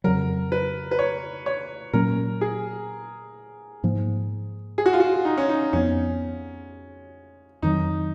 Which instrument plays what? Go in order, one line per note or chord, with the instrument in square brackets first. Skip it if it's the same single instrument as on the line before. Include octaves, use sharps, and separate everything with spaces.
[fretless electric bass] F2 C#3 F#3 [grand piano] A#4
[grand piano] B4
B4
C#5
C#5
[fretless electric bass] A#2 F#3 A#3 C#4 [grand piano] A#4
[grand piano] G#4
[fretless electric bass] G#2 F3 A#3
[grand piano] G#4
F#4
F4
F#4
D#4
C#4
D#4
[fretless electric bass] F2 F3 B3 [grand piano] C#4
[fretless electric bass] F2 D#3 F#3 [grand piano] D#4